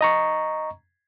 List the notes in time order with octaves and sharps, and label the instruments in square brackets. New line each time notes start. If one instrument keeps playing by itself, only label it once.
[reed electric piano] D#5 A#5 C#6